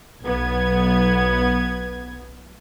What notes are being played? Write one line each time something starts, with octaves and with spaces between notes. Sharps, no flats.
B1 B3 G#6